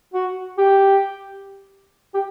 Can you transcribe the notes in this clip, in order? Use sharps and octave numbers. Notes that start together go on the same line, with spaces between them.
F#4
G4
G4